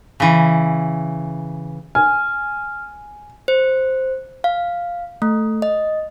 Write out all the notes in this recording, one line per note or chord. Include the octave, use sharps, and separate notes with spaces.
C#3 E3
G#5 F6
C5
F5
A3
D#5